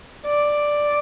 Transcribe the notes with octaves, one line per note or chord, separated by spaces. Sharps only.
D5